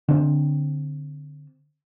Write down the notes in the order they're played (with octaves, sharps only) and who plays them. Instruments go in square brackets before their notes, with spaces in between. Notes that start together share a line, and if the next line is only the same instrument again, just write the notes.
[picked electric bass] D3 C4